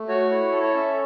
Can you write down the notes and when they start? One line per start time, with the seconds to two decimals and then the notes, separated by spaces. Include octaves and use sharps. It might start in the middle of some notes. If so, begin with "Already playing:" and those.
Already playing: A3
0.08 F#4 C#5
0.31 E4
0.52 A4
0.63 C#5
0.74 C#4 E5